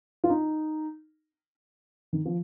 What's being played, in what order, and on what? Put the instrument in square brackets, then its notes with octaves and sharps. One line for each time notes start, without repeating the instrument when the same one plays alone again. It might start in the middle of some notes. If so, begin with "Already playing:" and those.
[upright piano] F4
D#4
D#3
F3